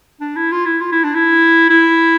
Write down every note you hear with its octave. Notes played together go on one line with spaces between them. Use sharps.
D4
E4
F4
E4
F4
E4
D4
E4
E4